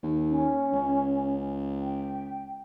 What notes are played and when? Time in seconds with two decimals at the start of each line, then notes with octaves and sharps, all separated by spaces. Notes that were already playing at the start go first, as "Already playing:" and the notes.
0.03 D#2
0.29 C#4
0.73 C#2
1.82 G5